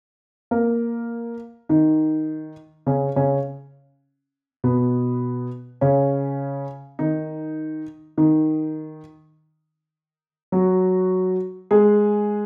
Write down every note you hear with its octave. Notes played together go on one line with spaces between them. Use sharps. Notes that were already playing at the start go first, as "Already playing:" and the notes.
A#3 A#4
D#3 D#4
C#3 C#4
C#3 C#4
B2 B3
C#3 C#4
D#3 D#4
D#3 D#4
F#3 F#4
G#3 G#4